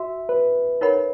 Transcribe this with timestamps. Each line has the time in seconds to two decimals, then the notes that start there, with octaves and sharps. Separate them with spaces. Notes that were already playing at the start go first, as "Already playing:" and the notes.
Already playing: F#4 E5
0.29 B4
0.81 D#4 A#4 C#5 F#5 B5